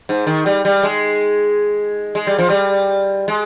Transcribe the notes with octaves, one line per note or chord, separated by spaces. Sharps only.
G#2
D#3
G3
G3
G#3
G#3
G3
F3
G3
G#3